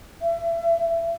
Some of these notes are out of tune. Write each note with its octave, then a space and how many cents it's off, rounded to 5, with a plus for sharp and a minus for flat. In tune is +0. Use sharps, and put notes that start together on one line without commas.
E5 +30